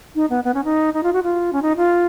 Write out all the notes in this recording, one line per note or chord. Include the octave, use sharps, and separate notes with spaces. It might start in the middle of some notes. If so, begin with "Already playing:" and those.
D#4
B3
B3
C#4
D#4
D#4
F4
F#4
F4
C#4
D#4
F4